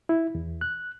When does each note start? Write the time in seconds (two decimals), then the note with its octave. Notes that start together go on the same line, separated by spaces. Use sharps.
0.09 E4
0.35 E2
0.61 F#6